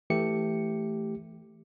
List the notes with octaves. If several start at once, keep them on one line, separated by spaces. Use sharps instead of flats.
E3 A3 G4 C#7